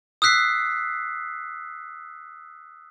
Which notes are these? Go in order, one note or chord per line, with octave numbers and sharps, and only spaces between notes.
D#6 E6 F#6 B6 C7